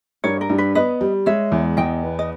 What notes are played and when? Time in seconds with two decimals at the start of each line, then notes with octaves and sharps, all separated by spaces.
0.24 G2 A#4 C#5
0.41 A#4
0.49 G2
0.58 B4
0.75 B3 B4 D#5
1.01 G3
1.26 G#3 C#5 E5
1.52 E2
1.77 E2 D#5 G5
2.03 B3
2.19 D#5